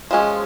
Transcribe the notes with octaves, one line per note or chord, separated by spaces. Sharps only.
F3 G#3 C#4